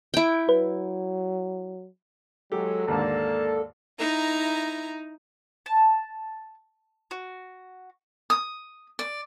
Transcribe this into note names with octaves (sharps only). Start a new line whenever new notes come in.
E4 G5
F#3 B4
F#3 G#3 G4 A4
D#2 G#2 D3 A#3 D5 A5
D#4 E4 A#5
A5
F#4
D#6
D5